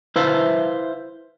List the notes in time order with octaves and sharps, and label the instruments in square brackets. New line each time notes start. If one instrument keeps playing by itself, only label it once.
[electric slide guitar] E4 B4 C5 E5 F5